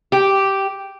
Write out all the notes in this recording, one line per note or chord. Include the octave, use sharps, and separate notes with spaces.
G4